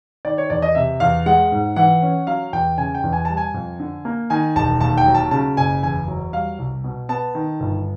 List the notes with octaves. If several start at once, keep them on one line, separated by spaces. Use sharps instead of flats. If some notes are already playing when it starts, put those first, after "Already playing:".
D#3 D5
C#5
E2 D5
D#5
C3 E5
E2 F5
G#3 F#5
G#2
E3 F#5
C#4
F#3 F5
E2 G5
C#3 G#5
G5
E2
G#5
G3 A5
G#5
F2
D3
A#3
D#3 G#5
E1 A5
D#2 A5
G5
F#3
A5
C#3 A5
F#1 G#5
E2 G#5
F#3
G3 F5
C2
B2
B3 A5
D#3
G1